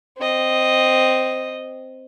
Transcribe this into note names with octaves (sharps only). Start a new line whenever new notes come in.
C4 D#5